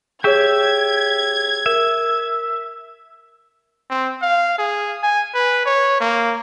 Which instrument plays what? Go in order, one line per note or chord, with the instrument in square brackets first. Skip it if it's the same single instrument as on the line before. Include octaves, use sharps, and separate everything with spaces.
[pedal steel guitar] G4 E5 [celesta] G#4 C#5 [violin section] G#6
[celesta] A#4 [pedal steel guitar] E5
[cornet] C4
F5
G#4
G#5
B4
C#5
A#3